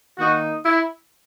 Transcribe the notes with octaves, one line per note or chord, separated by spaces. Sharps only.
D#3 A#3 D#4 F#4
E4